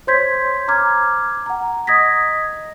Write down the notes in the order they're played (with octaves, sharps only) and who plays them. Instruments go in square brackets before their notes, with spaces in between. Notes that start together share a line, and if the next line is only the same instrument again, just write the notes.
[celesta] C5 C#5 C6 G6 G#6 B6
A#5 D6 F6 G#6
F#5 A#5
D#5 D#6 G#6 A#6 B6